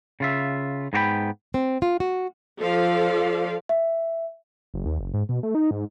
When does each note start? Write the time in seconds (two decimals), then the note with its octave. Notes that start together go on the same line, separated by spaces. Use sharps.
0.20 C#3 F4 E5
0.93 G#2 B3 F#4 A#4 G5 B5
1.54 C4
1.82 F4
2.00 F#4
2.60 F3 A4 D5 F5
3.69 E5
4.74 F#1
4.86 D#2
4.99 F#1
5.14 G#2
5.29 B2
5.43 A3
5.55 D#4
5.71 G#2